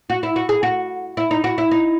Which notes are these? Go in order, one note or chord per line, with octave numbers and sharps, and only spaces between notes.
F#4
E4
F#4
G#4
F#4
E4
D#4
F#4
E4
D#4